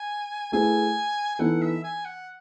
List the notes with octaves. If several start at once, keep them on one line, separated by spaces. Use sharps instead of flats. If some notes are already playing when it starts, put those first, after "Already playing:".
Already playing: G#5
A3 E4 G#4 B4 G#5
G#5
E3 B3 D#4 A4 F#5
E5
G#5
F#5